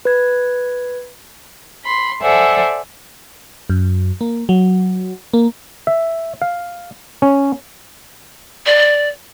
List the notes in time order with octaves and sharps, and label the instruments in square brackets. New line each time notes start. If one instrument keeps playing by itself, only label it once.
[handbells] B4 G#6
[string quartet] B5 C6
A4 C5 D5 E5 F#5 G#5
[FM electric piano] F#2
A#3
F#3
A#3
[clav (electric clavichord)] E5
F5
C#4
[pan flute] D5